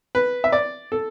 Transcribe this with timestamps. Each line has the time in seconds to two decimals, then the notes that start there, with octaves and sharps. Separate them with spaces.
0.15 B4
0.44 E5
0.52 D5
0.92 A4